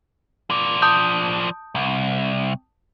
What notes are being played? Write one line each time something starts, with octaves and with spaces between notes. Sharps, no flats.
F3 D5
A5 D#6 G6
C2